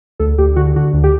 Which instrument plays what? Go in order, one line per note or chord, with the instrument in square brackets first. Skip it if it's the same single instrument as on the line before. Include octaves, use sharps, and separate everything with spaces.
[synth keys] D2 A4
D2 G4
D3 F#4
D3 F#4
D2
G4